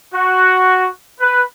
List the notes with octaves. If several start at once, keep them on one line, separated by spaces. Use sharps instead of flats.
F#4
B4